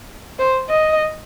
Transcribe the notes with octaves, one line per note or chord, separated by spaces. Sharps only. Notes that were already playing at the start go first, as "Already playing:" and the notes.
C5
D#5